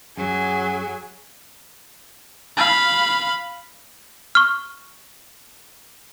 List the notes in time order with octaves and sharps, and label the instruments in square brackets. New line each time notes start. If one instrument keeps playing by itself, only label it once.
[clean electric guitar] F#2 [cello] F#3 [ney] G#4 [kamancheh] G#5
[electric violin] F5 B5
[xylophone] C#6 F6